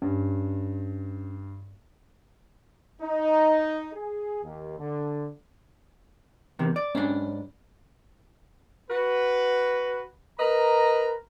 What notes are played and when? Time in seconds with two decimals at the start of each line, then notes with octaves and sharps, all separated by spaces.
0.02 G2 C#4
3.02 D#4
3.94 G#4
4.44 D#2
4.79 D3
6.59 E2 C3 D#3
6.76 D5
6.95 G#2 C#4 D4
8.90 F#4 B4
10.39 A#4 B4 D#5 A#5